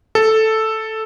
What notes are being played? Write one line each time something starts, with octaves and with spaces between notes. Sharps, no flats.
A4